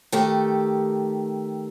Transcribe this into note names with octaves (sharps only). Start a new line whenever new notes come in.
D#3 A3 G4